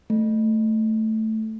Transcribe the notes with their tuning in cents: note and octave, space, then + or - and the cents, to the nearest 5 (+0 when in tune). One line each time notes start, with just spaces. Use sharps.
A3 +0